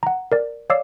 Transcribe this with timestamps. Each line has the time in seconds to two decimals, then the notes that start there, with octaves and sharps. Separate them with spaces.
0.03 F#5 A#5
0.32 A#4 D5
0.70 C#5 D5 F5 D6 E6 C7